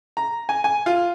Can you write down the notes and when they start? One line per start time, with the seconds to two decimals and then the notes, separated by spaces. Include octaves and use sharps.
0.17 A#5
0.49 G#5
0.64 G#5
0.86 F4